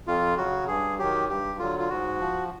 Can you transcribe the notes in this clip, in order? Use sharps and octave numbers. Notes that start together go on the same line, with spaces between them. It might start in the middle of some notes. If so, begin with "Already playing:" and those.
F2 F4
C#3 F#3 F#4
G2 G#4
D#3 F#3 G4
G2 G4
D3 F#3 F4
F4
G#2 F#4
F3